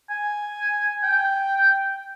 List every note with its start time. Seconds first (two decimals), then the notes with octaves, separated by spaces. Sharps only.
0.10 G#5
1.03 G5